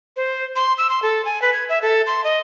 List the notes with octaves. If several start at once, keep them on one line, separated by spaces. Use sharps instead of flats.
C5
C6
E6
C6
A4
G#5
B4
G#6
E5
A4
C6
D#5